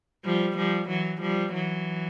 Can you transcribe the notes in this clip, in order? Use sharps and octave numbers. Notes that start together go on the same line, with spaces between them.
F3 G3
F3 G3
E3 F#3
F3 G3
E3 F#3